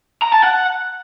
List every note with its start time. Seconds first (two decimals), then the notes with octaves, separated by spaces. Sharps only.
0.22 A#5
0.33 A5
0.43 F#5